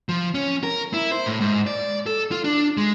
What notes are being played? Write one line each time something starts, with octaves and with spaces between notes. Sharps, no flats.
F3
C#4
A#4
E4
C5
A2
G#2
D5
A4
F4
D4
G#3